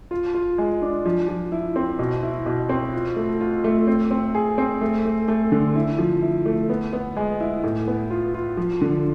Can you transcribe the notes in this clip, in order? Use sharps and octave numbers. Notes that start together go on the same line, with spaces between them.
F4
F4
G#3
D4
F3
F3
E4
C4
B2
E4
B2
C4
F4
A3
F4
A3
C4
C4
G#4
C4
A3
A3
A3
D3
E4
F3
E4
A3
B3
B3
G#3
E4
A2
B3
F4
F4
F3
D3